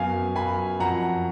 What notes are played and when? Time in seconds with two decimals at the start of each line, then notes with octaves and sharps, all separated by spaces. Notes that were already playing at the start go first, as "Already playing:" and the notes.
Already playing: F#2 B3 F5 G#5
0.35 F#2 G#5 B5
0.80 F2 F#5 A#5